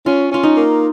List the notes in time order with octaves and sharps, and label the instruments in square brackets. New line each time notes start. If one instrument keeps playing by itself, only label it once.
[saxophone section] C#4 [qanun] F4
[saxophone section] C#4 [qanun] F4
[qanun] D#4
[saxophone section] A#3